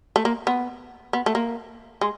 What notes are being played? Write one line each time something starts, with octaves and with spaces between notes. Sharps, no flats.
A3
A#3
B3
B3
A3
A#3
G#3